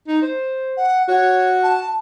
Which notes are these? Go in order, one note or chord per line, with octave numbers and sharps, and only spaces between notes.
D#4
C5
F#5
F#4 C#5
A5